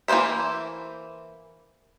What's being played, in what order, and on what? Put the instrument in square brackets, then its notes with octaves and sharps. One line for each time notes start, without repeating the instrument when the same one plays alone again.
[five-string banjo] E3 A#3 B4 C5 E5